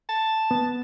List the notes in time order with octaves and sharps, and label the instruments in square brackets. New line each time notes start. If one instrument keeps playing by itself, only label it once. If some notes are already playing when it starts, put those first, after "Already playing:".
[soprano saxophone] A5
[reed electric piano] B3